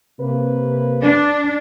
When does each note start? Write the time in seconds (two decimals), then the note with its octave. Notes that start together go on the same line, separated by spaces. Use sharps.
0.20 C3 A#3 B4
1.01 D4